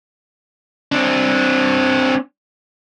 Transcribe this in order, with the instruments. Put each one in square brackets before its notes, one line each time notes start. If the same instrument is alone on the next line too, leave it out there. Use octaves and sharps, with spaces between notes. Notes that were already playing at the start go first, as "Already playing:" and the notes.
[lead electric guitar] C4 D4